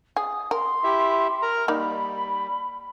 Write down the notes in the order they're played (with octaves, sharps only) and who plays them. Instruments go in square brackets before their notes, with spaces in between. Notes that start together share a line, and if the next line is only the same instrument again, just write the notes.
[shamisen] G#4 [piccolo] D#6
[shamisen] A#4 [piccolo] C6
[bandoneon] E4 G4 E5
A#4 A#5
[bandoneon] G3 [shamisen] A#3 D#4 [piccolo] B5